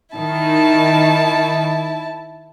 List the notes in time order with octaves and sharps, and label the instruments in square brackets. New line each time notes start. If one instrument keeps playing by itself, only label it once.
[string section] D#3 [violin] E4 A5